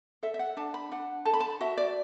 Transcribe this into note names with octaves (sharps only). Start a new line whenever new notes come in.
A4 E5
E5
F#5
D4 A5
B5
D4 F#5
A4 A5
B5
A5
F#4 E5
D5